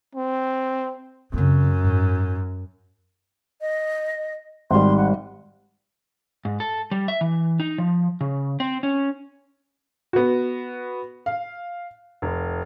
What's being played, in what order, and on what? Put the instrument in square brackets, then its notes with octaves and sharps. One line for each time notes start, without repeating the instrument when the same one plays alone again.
[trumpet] C4
[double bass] F#2 [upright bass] C#3 C4
[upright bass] G#2
[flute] D#5
[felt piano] G#1 G3 [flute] C6
[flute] F#5
[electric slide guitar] G#2
A4
G3
E5
E3
D#4
F3
C#3
C4
C#4
[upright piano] B3 F#4
F5
F1